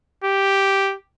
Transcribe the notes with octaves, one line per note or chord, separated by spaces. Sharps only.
G4